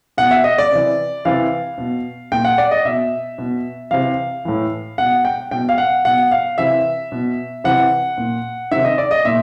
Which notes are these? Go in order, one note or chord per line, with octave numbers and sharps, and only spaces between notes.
B2 F#5
E5
D#5
D5
C3 E3
C3 E3 F5
B2
A#2 G5
F#5
D5
D#5
B2 E5
B2
C3 E3 F5
A2 E3
B2 F#5
G5
B2 G5
F5
F#5
B2 F#5
F5
C3 E3 E5
B2
C3 E3 F#5
A#2
C3 D#3 E5
D#5
D5
D#5
A#2 E5